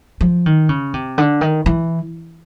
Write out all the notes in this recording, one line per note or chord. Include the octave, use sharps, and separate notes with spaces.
F3
D#3
C#3
C3
D3
D#3
E3